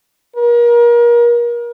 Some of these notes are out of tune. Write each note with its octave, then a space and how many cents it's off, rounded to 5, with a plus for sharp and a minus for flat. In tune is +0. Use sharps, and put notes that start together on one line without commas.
A#4 +35